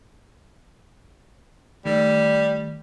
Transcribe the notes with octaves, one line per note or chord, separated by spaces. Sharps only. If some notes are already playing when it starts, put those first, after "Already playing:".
D#3 G3 A3